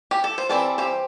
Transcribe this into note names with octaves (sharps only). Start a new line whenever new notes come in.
G4
A4
C5
E3 G3 C4 A4 D5
G4 C5